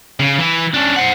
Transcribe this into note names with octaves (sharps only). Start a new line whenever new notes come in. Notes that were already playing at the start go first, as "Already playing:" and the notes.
C#3
E3
C#4 D4
C5 F#5